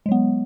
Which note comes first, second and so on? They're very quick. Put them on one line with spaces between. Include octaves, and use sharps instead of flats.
G#3 F#3 B3